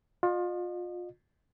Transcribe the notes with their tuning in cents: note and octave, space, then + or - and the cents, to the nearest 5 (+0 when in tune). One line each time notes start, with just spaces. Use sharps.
F4 +30 D#5 -35